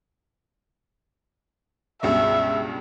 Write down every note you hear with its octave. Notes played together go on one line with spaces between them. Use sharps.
C#2 G2 B2 E5